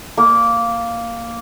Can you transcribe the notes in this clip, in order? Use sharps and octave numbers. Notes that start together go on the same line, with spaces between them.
A#3